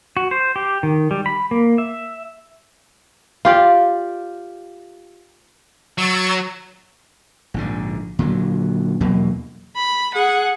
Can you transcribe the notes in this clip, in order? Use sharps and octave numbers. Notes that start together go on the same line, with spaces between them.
F#4
C5
G4
D#3
G3
B5
A#3
E5
F4 G4 D5
F#3 C#6 E6 A6
A#1 G#2 D3
A#2 D3 F#3
E2 B2 F#3 A#3
B5
G#4 F#5